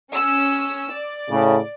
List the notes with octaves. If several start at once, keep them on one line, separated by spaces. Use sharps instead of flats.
C#4 E6
D5
A2 C#3